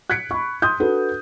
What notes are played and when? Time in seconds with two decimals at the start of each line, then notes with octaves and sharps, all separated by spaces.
0.10 F#6 G#6 B6 C#7 D7
0.31 B5 C#6
0.62 C6 D#6 G6
0.80 D4 F#4 A4 B4